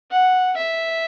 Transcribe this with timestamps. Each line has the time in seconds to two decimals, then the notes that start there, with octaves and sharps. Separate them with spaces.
0.11 F#5
0.57 E5